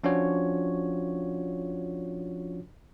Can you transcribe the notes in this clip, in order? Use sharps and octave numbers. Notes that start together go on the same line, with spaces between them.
F3 C#4 D4 F4 F#4 C#5